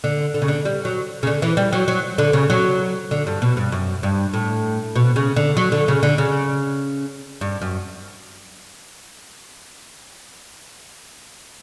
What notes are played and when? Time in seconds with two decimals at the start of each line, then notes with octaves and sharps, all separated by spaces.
0.04 D3
0.34 D3
0.42 C#3
0.48 D3
0.65 G3
0.85 F#3
1.23 C#3
1.27 D3
1.42 E3
1.57 G3
1.73 F#3
1.88 F#3
2.18 D3
2.33 C#3
2.50 F#3
3.11 D3
3.27 G2
3.42 B2
3.57 G2
3.72 F#2
4.03 G2
4.34 A2
4.96 B2
5.16 C#3
5.36 D3
5.57 F#3
5.72 D3
5.88 C#3
6.03 D3
6.18 C#3
7.41 G2
7.62 F#2